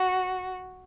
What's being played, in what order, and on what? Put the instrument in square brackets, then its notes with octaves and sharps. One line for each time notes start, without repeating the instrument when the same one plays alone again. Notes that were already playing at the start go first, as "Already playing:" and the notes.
Already playing: [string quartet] F#4